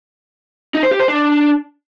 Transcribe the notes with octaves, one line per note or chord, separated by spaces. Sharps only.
D#4
C5
G4
C5
D4